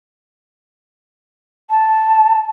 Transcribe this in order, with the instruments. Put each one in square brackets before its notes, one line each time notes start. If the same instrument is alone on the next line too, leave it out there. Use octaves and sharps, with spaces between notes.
[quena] A5